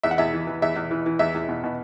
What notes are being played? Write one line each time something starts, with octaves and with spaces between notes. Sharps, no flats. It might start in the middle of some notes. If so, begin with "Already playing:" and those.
E2 E5
F#5
E2 E5
E3
E3
E2 E5
E2
E3
E3
E2 E5
E2
B2
B2